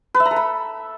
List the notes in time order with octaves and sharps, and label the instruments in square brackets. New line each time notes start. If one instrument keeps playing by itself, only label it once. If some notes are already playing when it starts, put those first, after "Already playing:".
[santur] B4
E5
A#5
A4
B5